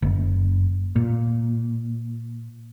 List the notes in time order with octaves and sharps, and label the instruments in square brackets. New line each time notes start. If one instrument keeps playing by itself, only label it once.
[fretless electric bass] F#1
A#2